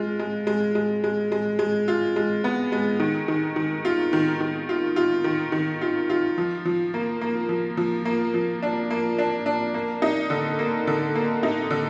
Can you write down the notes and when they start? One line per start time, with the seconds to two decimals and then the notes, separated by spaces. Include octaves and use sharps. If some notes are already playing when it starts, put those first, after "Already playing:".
Already playing: G#3 F4
0.19 G#3
0.47 G#3
0.75 G#3
1.04 G#3
1.32 G#3
1.59 G#3
1.88 F4
2.16 G#3
2.44 B3
2.72 G#3
3.00 D#3
3.28 D#3
3.56 D#3
3.85 F4
4.13 D#3
4.40 D#3
4.69 F4
4.96 F4
5.24 D#3
5.52 D#3
5.81 F4
6.10 F4
6.38 F3
6.65 F3
6.94 A#3
7.21 A#3
7.49 F3
7.77 F3
8.05 A#3
8.34 F3
8.63 D4
8.91 A#3
9.18 D4
9.46 D4
9.74 A#3
10.02 D#4
10.30 D3
10.59 A#3
10.87 D3
11.15 A#3
11.43 D#4
11.70 D3